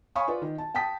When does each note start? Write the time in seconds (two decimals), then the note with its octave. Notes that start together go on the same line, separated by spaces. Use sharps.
0.16 C#5 F5 G#5 B5 C#6 D#6
0.28 F4 B4 D5
0.42 D#3
0.58 A5
0.75 G5 A5 D#6 B6